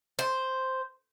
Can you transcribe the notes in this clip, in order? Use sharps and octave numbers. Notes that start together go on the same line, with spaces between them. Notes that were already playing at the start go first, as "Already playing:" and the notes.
C5